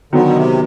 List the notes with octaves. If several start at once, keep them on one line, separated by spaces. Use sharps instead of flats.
D3 D#3 F#3 B3
B2
C3